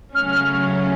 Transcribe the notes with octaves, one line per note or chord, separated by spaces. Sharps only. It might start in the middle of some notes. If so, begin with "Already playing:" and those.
C#3 F#3 A3 C#4 F6
F6